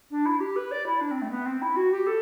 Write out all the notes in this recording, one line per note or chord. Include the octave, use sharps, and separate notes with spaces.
D4
E4
G4
B4
D5
E4
D4
C4
A3
B3
C4
E4
F#4
G4
A4